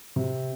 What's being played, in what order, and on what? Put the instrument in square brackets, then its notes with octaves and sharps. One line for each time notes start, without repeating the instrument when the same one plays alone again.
[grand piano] C3